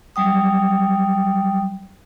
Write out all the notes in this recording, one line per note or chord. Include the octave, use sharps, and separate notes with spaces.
F#3 G3 G5 D#6